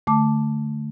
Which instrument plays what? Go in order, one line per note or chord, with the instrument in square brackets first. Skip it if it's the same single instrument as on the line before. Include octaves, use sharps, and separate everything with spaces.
[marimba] D3 A3 A5 D6